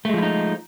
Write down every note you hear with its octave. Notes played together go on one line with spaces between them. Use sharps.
F3 G#3 A3 D#4 E4